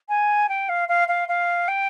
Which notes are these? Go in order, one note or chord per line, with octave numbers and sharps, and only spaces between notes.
G#5
G5
F5
F5
F5
F5
G5